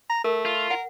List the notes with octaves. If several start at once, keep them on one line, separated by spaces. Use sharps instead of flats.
A#5
A3 A#4
F4
A#4 F#5